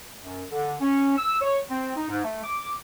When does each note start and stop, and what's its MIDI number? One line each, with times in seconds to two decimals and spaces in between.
0.22 0.43 42
0.51 0.75 50
0.81 1.15 61
1.18 1.37 88
1.41 1.58 73
1.69 1.95 60
1.96 2.08 63
2.09 2.22 44
2.23 2.43 57
2.43 2.73 86